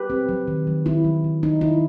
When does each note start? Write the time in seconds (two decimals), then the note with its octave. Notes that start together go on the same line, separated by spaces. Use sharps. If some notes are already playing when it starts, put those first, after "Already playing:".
Already playing: G4 B4
0.10 C4
0.29 F#3
0.48 D#3
0.67 F#3
0.86 D#3 E4
1.04 F#3
1.24 D#3
1.43 D#3 D#4
1.61 D#3 E4